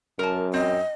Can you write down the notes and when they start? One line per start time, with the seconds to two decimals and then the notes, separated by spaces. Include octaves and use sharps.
0.19 F#2 A#4 A5
0.54 C4 D#5